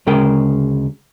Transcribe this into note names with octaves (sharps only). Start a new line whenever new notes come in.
D2 C#3 G#3 A#4 G5